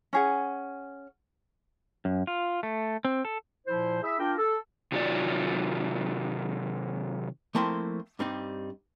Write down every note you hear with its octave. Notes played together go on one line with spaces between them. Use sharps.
C#4 G#4 F#5
F#2
F4
A3
C4
A4
A#2 F3 E4 C5
E4 G#4 E5
D4 F4 A#4 G5
A4
C3 D#3 F#3 F4 D5
F3 A3 A#3 C4 E4 C6
G2 G3 C4 D#4